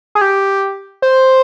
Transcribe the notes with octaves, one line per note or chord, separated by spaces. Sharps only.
G#4
G4
C5